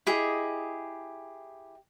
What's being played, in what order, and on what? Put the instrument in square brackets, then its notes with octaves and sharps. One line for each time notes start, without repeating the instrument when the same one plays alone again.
[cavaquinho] E4 G4 G#4 D#5